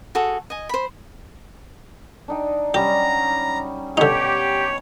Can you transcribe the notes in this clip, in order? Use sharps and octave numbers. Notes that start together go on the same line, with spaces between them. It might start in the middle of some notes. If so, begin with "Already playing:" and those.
F#4 G#4 A4
D#5 G#5
C5 B5
D4 D#4 G5
F#3 G3 C#4 G4 A#5
B2 D3 D#4 G4 C#5